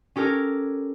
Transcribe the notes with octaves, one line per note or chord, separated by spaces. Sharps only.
C#4 G4 A4 A#4